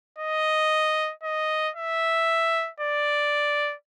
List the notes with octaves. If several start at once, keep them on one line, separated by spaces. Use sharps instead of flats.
D#5
D#5
E5
D5